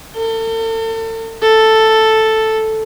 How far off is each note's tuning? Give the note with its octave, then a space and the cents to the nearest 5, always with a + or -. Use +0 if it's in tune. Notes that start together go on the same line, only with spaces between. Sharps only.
A4 +40
A4 +0